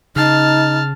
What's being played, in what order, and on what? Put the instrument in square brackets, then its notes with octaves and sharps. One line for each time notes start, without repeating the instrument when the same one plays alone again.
[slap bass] C#3 [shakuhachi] D#4 [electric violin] A5 F6